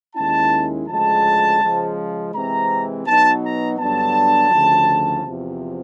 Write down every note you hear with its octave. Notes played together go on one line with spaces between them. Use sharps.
D#2 D#3 G#3 C#4 E4 A5
D2 C#3 F3 G#3 A5
C#3 F3 G#3
C3 E3 G#3 C4 A#5
B2 F#3 B3 D#4 A5
A#5
G2 D3 F#3 B3 D4 A5
D2 C#3 F3
E2 C3 F3